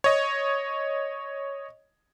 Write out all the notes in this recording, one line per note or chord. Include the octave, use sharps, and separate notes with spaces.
C#5 D#5